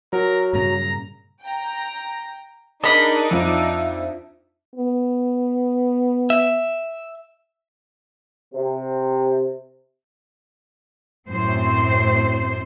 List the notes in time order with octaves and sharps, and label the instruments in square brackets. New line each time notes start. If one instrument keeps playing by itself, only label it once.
[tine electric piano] F#3 [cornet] A#4
[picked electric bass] G2 A#2 C#3 [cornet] A#5
[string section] G5 A#5
[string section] D4 D#4 [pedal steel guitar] G#4 A#4 A5 [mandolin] D#5 B5
[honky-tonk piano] F2 C4 F4 [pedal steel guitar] E5
[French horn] B3
[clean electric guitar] E5
[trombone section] C3
[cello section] F#2 A2 C4 C5